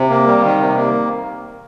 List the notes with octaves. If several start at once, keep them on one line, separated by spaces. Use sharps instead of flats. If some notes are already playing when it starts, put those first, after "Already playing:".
Already playing: C3
A#3
G3
D#3
C3
A#3